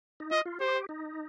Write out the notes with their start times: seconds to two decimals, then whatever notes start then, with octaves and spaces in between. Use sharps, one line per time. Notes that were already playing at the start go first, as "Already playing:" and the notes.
0.20 D#4
0.31 F4 D#5
0.45 F4
0.60 G4 C5
0.89 D#4